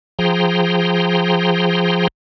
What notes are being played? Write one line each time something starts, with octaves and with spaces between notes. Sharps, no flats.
F3 G#4 G5 A#5 C6